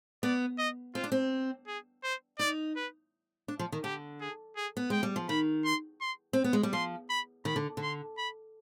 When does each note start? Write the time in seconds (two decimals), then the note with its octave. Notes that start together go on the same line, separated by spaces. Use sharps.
0.23 B3 D5
0.58 D#5
0.95 C4 F4
1.04 D4
1.12 C4
1.67 G#4
2.04 C5
2.39 D#4 D5
2.76 B4
3.48 D4
3.59 F3
3.72 D#3
3.84 D3 G4
4.21 G#4
4.56 G#4
4.77 B3
4.90 G#3 G5
5.03 G3
5.16 F3
5.29 D#3 B5
5.65 C6
6.01 C6
6.33 C4
6.44 B3
6.53 G#3
6.63 G3
6.73 F3 C6
7.10 B5
7.45 D#3 B5
7.56 D3
7.77 D3 C6
8.18 B5